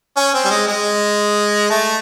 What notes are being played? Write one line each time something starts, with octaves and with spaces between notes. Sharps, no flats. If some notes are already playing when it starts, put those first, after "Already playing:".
C#4
C4
G3
G#3
G#3
A3